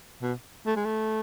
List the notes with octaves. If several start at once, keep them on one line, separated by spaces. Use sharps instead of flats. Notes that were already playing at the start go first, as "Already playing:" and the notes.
B2
A3
G#3
A3